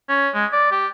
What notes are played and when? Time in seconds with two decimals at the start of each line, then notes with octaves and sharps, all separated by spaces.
0.09 C#4
0.34 G#3
0.53 D5
0.71 G4